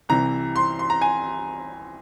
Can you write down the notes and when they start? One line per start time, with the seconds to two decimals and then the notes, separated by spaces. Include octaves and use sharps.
0.09 C2 C3 E3 A#5
0.56 C6
0.79 C6
0.90 A#5
1.01 G#5